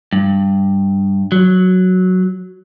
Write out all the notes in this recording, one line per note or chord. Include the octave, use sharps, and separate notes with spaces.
G2
F#3